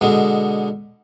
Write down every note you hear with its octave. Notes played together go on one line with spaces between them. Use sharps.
B2 D3 G#3